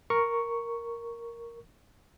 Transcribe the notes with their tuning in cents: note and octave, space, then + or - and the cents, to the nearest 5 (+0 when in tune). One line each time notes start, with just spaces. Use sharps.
A#4 +0 C#6 +5